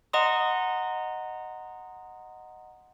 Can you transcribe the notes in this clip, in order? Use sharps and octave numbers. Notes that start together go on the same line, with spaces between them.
D#5 F#5 A#5 C6 D#6